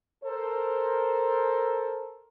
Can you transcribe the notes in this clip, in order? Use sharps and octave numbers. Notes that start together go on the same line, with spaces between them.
A4 A#4 C5